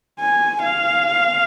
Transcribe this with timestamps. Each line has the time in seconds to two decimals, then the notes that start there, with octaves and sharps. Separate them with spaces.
0.20 G#5
0.62 F5